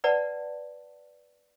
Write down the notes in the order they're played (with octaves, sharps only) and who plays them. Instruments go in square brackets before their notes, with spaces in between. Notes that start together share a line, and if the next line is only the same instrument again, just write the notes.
[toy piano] B4 D5 F#5 A5